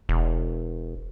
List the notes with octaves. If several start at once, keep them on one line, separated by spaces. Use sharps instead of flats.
E1